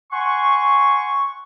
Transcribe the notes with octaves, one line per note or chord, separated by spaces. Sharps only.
F#5 G#5 C6 C#6